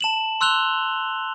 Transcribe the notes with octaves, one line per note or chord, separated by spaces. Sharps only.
A5 E7 F#7
C6 E6 F#6 F7 G7